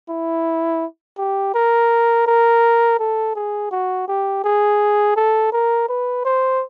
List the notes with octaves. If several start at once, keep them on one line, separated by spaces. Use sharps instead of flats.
E4
G4
A#4
A#4
A4
G#4
F#4
G4
G#4
A4
A#4
B4
C5